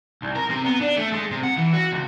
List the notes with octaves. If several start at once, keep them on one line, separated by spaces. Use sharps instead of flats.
C2
A#4
C3
B3
D4
A3
G#3
C3
F#5
E3
F#4
C#2